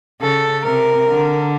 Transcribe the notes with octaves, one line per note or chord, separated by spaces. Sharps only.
C#3 A4
C3 A#4
D3